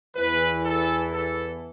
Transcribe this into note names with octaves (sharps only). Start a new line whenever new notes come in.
E2 E3 B4
A4
A4